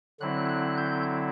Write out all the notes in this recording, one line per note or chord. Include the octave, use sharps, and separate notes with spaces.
D3 F#3 C4 E4 F#6
F#6
G6